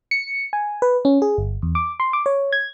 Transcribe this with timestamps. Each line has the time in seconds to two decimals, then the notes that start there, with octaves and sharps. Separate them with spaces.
0.11 C#7
0.53 G#5
0.82 B4
1.05 C#4
1.22 G#4
1.38 G1
1.62 E2
1.75 D6
2.00 C6
2.13 D6
2.26 C#5
2.53 G#6